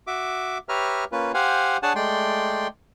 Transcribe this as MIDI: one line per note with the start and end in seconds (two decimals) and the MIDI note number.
0.07 0.58 66
0.07 0.58 76
0.07 0.58 86
0.69 1.04 67
0.69 1.04 71
0.69 1.04 73
0.69 1.04 76
0.69 1.04 82
0.69 1.04 89
1.12 1.32 58
1.12 1.32 61
1.12 1.32 65
1.12 1.32 71
1.34 1.77 67
1.34 1.77 72
1.34 1.77 77
1.34 1.77 78
1.34 1.77 80
1.83 1.93 62
1.83 1.93 68
1.83 1.93 73
1.83 1.93 78
1.83 1.93 80
1.83 1.93 81
1.96 2.67 56
1.96 2.67 57
1.96 2.67 74
1.96 2.67 79
1.96 2.67 84